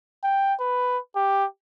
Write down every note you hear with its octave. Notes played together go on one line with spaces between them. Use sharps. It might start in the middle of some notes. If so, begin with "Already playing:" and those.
G5
B4
G4